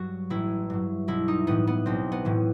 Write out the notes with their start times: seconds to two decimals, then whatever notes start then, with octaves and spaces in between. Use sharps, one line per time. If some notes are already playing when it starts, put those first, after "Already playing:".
Already playing: G2 F#3 F#4
0.30 A1 E4
0.70 G2 F#3
1.08 B1 E4
1.28 D#4
1.47 A2 E3 B3
1.67 B3
1.86 B1 C4
2.12 B3
2.25 A2 E3